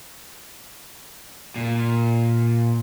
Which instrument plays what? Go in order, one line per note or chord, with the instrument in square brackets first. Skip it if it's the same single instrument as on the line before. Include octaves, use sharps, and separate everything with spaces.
[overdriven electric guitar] A#2